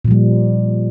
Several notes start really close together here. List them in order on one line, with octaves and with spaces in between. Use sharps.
A#2 F3 G3